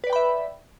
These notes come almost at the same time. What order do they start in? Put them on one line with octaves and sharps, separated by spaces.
B4 D5 G5 B5 E5